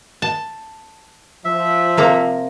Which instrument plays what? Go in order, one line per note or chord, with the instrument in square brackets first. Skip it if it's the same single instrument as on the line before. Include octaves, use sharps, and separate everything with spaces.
[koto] A5
[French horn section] F3 [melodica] E5
[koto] C3 A#3 A#5